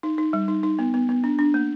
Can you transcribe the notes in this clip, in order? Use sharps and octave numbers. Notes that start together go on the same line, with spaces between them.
D#4
D#4
G3
D#4
D#4
B3
B3
B3
D4
D4
A#3